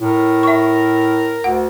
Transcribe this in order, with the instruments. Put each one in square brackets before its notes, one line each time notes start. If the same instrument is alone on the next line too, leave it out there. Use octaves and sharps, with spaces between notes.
[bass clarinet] A2 [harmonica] A#4
[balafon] E5 C#6
[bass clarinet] D2 [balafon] F#5